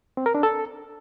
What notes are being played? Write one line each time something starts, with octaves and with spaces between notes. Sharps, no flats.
C4
A#4
D4
A4